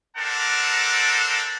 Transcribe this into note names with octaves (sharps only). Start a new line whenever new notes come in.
C4 D4 A4 A#4 F#5 A5